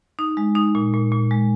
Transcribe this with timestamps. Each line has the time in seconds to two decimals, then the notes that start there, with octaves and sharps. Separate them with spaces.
0.19 D#4
0.37 G#3
0.55 D#4
0.75 A#2
0.94 A#2
1.12 A#2
1.31 G#3